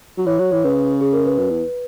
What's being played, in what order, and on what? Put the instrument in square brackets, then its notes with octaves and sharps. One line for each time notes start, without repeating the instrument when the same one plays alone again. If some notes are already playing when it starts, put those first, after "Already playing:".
[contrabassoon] F#3
[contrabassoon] E3 [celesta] C#5
[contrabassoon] F#3 [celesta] C#5
[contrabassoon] E3 [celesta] C#5
[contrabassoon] C#3 [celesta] B4
[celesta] G#4
A#4
B4
[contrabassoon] F#2 [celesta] B4
[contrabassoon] E2